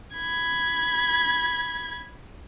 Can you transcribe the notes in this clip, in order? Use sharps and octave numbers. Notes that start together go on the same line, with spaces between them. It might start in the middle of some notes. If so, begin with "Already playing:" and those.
B5 G#6